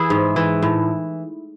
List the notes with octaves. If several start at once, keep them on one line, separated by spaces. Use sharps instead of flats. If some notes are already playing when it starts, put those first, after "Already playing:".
Already playing: E3 E4 G#4
G#2
E3
A2